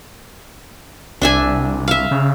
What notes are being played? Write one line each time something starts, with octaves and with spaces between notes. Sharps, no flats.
C2 D4 E5 G#5
E5 F5
C#3